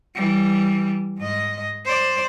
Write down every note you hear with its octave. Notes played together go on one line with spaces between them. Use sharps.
E3 G3
G#2 D#5
C5 D5